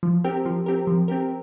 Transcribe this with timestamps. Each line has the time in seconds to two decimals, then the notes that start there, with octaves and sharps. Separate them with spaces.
0.03 F3
0.24 C4 G4 A#4
0.45 F3
0.66 C4 G4 A#4
0.87 F3
1.08 C4 G4 A#4